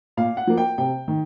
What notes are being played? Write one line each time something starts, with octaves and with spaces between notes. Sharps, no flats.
A#2 F5
F#5
F3 A#3
G5
C3 G5
D#3